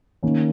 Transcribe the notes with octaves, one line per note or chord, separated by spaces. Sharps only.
D#3 A#3 C#4